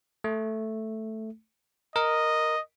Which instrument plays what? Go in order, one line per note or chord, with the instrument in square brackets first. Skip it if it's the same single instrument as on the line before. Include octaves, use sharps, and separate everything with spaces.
[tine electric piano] A3
[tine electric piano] A#4 [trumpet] D#5